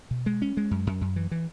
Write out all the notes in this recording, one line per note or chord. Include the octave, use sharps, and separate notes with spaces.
B2
G#3
C#4
G#3
F#2
F#2
F#2
E3
E3